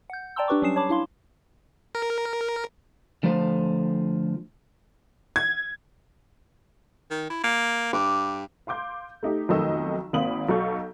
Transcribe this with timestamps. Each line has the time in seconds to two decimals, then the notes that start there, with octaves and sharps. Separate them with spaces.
0.10 F#5 G6
0.36 D5 G5 A5 A#5 C6 E6
0.48 D4 G4 B4 C#6 D6
0.62 F#3 G3 C#4 D#6 C7 E7
0.76 C#5 A5 B5 D6
0.89 D4 E4 F5 C6
1.95 A#4
3.23 D3 F3 A3 F4 C5
5.36 G#6
7.11 D#3
7.30 E4
7.44 A#3
7.93 G2 D6
8.67 F5 C6 D6 G6
9.23 A3 D#4 G4
9.49 B1 F2 D#3 A3 D#5 E6
10.13 G#1 A#3 C4 B5 D#6 F#7
10.49 B1 F#3 A4 F5 C#6 G6